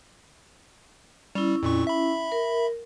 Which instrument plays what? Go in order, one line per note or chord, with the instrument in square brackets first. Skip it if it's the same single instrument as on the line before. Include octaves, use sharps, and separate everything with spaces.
[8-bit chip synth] G3 [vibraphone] C#4 E4
[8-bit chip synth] F2 A#2 C#6
E5 B5
[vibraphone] A#4